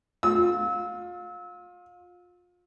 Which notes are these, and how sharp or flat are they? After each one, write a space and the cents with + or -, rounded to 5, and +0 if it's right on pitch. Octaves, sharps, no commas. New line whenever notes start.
F4 +30 E6 -30